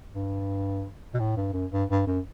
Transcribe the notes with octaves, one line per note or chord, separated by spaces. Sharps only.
G2
B2
A2
G2
F#2
G2
G2
F#2